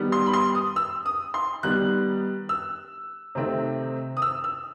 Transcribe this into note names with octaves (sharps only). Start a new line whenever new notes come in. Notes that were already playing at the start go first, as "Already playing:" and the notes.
Already playing: D#3 G3 B3
C6
B5
C6
D#6
E6
D#6
C6
D#3 G3 B3 F#6
E6
C3 D#3 A3 C4
D#6
E6
E6